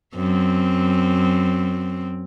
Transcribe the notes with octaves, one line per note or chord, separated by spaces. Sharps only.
F#2 C4